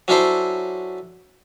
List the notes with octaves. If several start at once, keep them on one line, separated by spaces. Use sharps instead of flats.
F#3 C#4 D4 E4 A4 C5